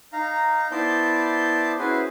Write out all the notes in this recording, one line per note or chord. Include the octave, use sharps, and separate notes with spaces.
D#4 F5 A#5
B3 E4 C5 D5 A5 G6
C#4 E4 F#4 G#4 B4 C5